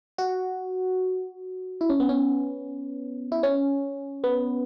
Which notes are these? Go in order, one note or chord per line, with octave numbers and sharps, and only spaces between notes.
F#4
E4
C#4
B3
C#4
E4
C#4
B3